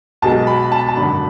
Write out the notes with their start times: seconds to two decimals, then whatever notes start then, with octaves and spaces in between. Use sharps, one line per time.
0.22 B1 B2 G#3 A5
0.47 B5
0.72 A5
0.88 A5
0.96 G#1 F#2 D3 B5